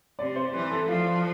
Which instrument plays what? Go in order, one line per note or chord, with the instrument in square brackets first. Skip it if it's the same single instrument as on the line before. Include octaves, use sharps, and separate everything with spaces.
[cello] C3 [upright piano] D5
[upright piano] C5
[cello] E3 [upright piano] B4
[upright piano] A4
[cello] F3 [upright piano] F4